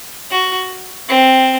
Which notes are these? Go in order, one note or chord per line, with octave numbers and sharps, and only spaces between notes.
F#4
C4